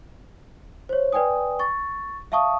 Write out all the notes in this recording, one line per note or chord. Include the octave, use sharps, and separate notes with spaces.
C5 C#5
B4 D5 G5 G#5 D#6
C#6 A6
E5 F5 A5 C#6 D#6